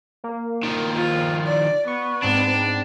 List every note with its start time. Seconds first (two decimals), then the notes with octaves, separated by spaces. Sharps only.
0.24 A#3
0.64 D#3 F3
0.96 F4
1.47 D5
1.87 B3 C#6
2.23 G#2 C4 D4